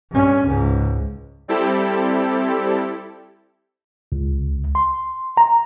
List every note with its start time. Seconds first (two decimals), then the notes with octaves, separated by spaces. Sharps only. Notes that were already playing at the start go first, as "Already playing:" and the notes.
0.11 G2 C#4
0.46 C#2 G#2
1.48 G3 C4 E4 G4 A4
4.12 C#2
4.75 C6
5.37 A#5